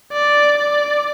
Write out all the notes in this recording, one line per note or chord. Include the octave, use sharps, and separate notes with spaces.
D5
D5